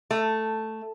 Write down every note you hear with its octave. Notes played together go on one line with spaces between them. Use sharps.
A3